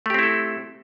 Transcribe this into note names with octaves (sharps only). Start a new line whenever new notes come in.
A3 C4 E4 G4 A4